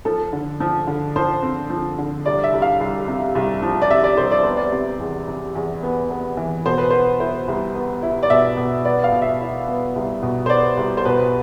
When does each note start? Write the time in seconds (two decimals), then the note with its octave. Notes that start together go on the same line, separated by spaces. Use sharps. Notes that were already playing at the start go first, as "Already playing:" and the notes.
0.05 F3 A4
0.33 D3
0.60 F3
0.87 D3
1.16 F3 C5
1.43 C4
1.70 F3
1.98 D3
2.25 C2 D5
2.44 E5
2.53 C2
2.62 F5
2.80 C2
3.08 C3
3.35 C2
3.62 F3
3.82 D5
3.90 C3 E5
4.04 D5
4.17 C2 C5
4.31 D5
4.44 B3 C5
4.57 D5
4.72 C3
5.00 E2
5.28 C3
5.55 E2
5.83 B3
6.11 B3
6.37 E3
6.66 B2 C5
6.78 B4
6.90 B3 C5
7.20 E4 C5
7.48 C2
7.75 B3
8.02 E4
8.23 D5
8.30 B2 E5
8.57 B2
8.85 B3 D5
9.04 F5
9.12 B2
9.22 E5
9.41 E4
9.68 B3
9.96 C2
10.23 B2
10.46 C5
10.49 B3 D5
10.77 C2
10.97 C5
11.05 B2 B4